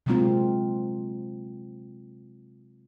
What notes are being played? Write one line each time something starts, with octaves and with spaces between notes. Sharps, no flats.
C3 F#3 G#3 A#3 C4 F4